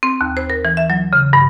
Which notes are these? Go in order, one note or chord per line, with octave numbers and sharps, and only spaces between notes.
C4
D#2
C5
A#4
E3
E5
F#3
C#3
G2